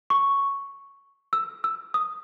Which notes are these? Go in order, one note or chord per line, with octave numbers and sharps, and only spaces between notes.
C#6
E6
E6
D#6